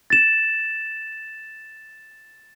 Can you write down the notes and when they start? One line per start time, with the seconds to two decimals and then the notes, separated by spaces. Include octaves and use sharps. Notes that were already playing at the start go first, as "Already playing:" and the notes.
0.10 A6 E7